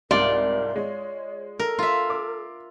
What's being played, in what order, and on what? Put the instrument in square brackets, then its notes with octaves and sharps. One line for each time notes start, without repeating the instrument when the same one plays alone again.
[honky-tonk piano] C2 G#2 [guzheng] F4 [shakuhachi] A#4 [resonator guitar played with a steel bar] D5
[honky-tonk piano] G#3 [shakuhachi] C#5
[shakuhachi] A4 [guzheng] A#4
[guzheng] F4 E5
[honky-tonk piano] D6